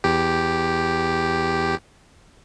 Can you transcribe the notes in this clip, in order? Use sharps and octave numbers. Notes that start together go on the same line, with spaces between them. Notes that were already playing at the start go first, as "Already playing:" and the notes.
E2 G4